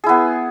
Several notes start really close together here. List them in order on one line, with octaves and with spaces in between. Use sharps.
G#4 E4 B3